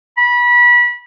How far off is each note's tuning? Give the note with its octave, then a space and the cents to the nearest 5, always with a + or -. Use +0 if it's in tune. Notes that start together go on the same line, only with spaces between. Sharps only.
B5 -25